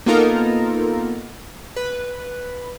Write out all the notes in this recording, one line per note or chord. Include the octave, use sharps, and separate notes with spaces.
A#3 B3 D#4 F4 A4 A#4
B4